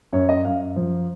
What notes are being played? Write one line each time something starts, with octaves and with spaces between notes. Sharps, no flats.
F#2 C#5
D#5
F#2 F5
F3